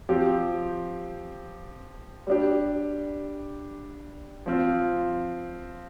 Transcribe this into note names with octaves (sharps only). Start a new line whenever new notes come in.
F3 C4 G4
G3 D4 G4
F3 C4 F4